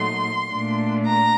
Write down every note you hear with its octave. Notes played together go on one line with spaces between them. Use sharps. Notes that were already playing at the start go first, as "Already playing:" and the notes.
Already playing: A#2 F#3 A3 D#4 C6
A#2 A3 D4
A#5